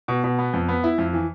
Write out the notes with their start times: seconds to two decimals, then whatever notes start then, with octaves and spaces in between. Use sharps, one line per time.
0.08 B2
0.24 B2
0.39 B3
0.53 F2
0.68 B3
0.84 E4
0.98 F2
1.13 E3